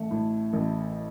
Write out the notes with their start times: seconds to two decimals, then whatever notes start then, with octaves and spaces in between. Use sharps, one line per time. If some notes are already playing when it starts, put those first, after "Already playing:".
Already playing: A1 A3
0.11 A2
0.53 A1